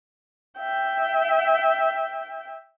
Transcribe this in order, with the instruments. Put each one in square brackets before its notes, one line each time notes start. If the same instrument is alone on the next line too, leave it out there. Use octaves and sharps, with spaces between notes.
[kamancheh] E5 G5